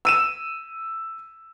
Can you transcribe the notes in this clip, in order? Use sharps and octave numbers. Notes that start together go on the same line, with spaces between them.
E6 D#7 E7